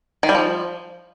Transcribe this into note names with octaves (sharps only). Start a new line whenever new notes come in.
D#3
G3
F3